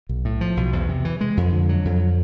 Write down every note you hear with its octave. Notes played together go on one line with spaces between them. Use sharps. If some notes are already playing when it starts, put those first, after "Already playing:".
B1
A2
F3
B1
E2
C3
E3
G#3
F2
D3
F#3
F2